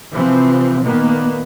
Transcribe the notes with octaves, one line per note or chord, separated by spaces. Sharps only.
C3 E3 F3 C4
A#2 D#3 A#3 B3